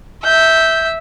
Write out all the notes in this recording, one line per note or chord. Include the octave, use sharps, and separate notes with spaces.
E5 G6